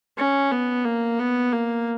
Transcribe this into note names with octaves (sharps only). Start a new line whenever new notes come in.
C#4
B3
A#3
B3
A#3